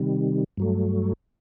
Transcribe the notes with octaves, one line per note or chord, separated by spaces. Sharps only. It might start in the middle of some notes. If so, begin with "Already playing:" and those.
Already playing: C3 D#3 G3
G2 F#3 A3